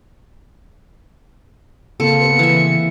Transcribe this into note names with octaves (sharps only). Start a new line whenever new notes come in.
C#3 A#3 C4 F4 A4 C#7
B3 G4 B4
E3 E5